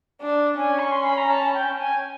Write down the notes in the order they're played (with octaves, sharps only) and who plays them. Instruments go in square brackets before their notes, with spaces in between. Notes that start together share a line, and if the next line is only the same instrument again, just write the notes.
[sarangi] D4
[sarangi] C#4 [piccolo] G#5
[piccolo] C#6
C6
B5
A#5
A5
G5
G#5